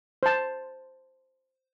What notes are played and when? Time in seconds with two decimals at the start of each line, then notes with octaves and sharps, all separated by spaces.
0.23 C5 A5